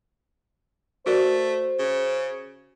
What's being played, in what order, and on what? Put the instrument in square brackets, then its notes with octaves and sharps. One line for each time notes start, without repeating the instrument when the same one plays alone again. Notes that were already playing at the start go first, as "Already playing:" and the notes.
[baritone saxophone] A3 [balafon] F#4 A#4 D5 [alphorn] C5
[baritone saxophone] C#3